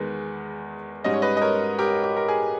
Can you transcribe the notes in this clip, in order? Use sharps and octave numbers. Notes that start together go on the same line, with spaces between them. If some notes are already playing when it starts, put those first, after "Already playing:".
Already playing: E2 D#3 G#3 B3 B4
G#2 G3 C#4 D#5
C#5
B4 D#5
D#5
A#4 C#5
G4 A#4
G4
A#4
G#4